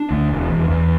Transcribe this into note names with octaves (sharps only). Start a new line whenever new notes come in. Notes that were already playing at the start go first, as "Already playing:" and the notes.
Already playing: D4
D2
E1
E2
E2